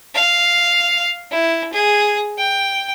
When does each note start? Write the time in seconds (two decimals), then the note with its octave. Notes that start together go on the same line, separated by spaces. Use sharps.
0.15 F5
1.31 E4
1.73 G#4
2.38 G5